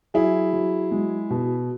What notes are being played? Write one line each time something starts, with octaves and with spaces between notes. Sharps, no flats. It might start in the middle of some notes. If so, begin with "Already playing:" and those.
F#3 E4 G#4
F#3
G#3
B2